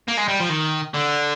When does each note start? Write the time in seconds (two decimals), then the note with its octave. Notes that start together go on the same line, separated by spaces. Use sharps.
0.08 A#3
0.18 G#3
0.28 G3
0.40 F3
0.49 D#3
0.94 D3